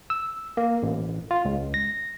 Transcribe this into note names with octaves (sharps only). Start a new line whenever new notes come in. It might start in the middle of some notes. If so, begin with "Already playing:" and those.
E6
A#3
A1
F4
C#2
A#6